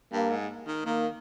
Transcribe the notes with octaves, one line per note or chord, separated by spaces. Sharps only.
G2 A#3
G#2
D#3
D#3 A#3